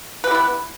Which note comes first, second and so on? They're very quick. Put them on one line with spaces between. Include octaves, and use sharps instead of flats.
B4 G4 E4 B3